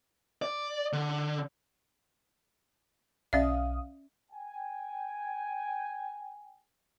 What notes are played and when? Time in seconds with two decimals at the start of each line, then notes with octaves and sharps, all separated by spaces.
0.42 D5
0.93 D3
3.33 B1 C#4 D5 E5 F5 D#6
4.32 G5 G#5